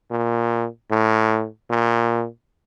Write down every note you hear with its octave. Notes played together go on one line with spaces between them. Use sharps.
A#2
A2
A#2